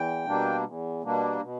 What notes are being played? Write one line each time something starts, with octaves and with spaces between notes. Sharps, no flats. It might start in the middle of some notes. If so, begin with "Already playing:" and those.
Already playing: E2 G5
B2 G3 A#3 D4
E2
B2 G3 A#3 D4
B2